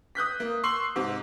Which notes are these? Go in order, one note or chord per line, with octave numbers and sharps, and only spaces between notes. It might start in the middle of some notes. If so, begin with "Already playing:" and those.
D#6 F#6 G6 B6
A#3
C6 C#6 E6 C7 F#7
G#2 C3